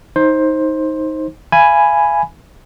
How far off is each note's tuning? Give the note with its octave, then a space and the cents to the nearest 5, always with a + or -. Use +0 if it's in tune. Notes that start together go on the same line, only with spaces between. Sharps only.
D#4 +15 C5 +15
F5 -40 G#5 +0 B5 +0